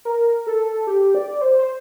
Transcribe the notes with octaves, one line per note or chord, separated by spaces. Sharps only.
A#4
A4
G4
D5
C5
C5